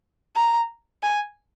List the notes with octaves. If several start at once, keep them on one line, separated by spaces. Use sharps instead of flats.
A#5
G#5